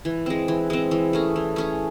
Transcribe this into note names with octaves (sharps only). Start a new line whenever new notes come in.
E3
G#3 C4
E3
G#3 C4
E3
A3 C#4 G#4
E3
A3 C#4 G#4